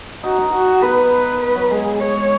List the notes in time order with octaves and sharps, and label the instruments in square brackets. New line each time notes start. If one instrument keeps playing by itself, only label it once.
[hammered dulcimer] D#4 [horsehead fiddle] F#4
[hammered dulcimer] D#4
[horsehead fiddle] F#4
[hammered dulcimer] B3 [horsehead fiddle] B4
[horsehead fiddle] B4
B4
[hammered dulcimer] F#3
[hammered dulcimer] G#3 [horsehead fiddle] G#4
[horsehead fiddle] C#5